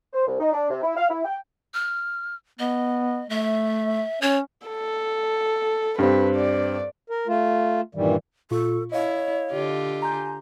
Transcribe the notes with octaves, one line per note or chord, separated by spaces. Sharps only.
C5
C2
D#4
D4
C3
E4
F5
E4
G5
F6
B3 D#5
A3 E5
C#4 C#5
A4
G2 C4 B4
D5
A#4
A3 F4
G2 A#2 D#3 E3 G3
A#2 F4 A4 C#6
E4 C#5 D#5 F5
D3 F4 G4
G#5 A#5 C6 G6